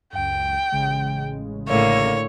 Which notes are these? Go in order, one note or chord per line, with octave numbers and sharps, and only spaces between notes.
C#2 F#2 G5
A1 C#3 G#3
A2 D3 A#3 C#5